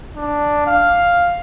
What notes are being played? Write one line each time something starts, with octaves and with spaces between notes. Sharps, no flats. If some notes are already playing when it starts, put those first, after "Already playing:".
D4
F5